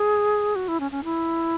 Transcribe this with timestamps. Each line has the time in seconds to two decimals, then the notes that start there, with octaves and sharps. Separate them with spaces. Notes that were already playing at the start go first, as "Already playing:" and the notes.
Already playing: G#4
0.56 F#4
0.68 E4
0.80 C#4
0.91 C#4
1.04 E4